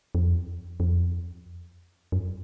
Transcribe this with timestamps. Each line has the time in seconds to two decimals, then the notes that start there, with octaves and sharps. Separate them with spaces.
0.15 F2
0.80 F2
2.12 F#2